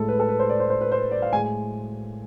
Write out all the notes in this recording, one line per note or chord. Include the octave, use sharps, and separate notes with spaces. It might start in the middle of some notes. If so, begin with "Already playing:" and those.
Already playing: A2 G#3 A4
B4
A4
B4
C5
D5
C5
C5
B4
C5
D5
F5
A2 G#3 G#5